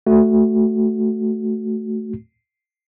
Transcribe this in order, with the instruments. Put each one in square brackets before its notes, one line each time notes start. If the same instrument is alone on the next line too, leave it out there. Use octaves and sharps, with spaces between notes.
[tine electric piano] A3 F#4